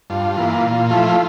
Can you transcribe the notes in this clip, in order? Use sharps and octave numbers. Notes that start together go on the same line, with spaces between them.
G2 F4
E3 A#3
A#2
F3 A3 E4